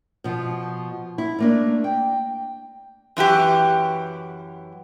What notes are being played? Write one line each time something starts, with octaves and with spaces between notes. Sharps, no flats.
B2 F3
E4
A3 A#3 D4
G5
F#2 E3 F#4 G4